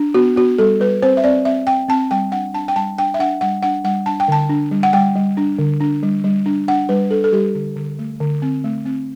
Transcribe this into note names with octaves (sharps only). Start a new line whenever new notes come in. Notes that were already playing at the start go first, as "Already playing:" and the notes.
Already playing: D4
B3 F#4
B3 F#4
G3 A4
G3 B4
C4 C5
E5
C4 D5
C4 E5
C4 G5
C4 A5
G3 G5
D4 F#5
D4 A5
G5
G3 A5
D4 G5
E5
D4 F#5
G3 F#5
D4 F#5
G3 F#5
D4 A5
G5
D3 A5
D4
G3
F#5
G3 G5
G3
D4
D3
D4
G3
G3
D4
D4 F#5
G3 B4
D4 A4
A4
G3 G4
D3
D3
A3
D3
C4
A3
C4